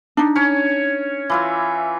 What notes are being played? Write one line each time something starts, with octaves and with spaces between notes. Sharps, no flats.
D4 D#4
C#4 C#5
E3 F4 E5